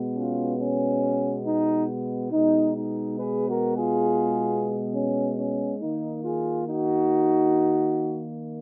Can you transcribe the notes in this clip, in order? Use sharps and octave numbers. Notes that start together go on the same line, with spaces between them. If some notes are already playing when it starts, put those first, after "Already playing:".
Already playing: B2 G#3 B3
C#4 F4
C#4
D#4
B2 G#3 B3 D#4
D#4
G#4 B4
F#4 A#4
F4 G#4
C#4
C#4
D#3 A#3 D#4
F4 G#4
D#4 F#4